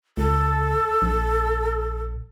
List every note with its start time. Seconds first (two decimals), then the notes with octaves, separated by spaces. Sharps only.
0.17 C#2 A4
1.02 A#1